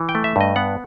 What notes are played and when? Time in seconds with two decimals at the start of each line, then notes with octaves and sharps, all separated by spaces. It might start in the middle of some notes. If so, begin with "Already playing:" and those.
Already playing: E3
0.09 G5
0.15 A3
0.24 E5
0.36 G2 D#5
0.56 B3 F#5